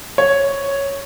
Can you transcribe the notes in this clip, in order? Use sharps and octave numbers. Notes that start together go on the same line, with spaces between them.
C#5